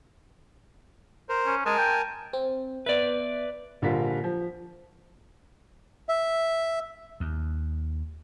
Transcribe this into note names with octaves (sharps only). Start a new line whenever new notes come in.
A#4 C5
C#4
G#3 A#4 G#5 A5
G5
C4
B3 B4 D5 E5
A#1 D3 G3 F4 A#4 B6
F3
E5
D#2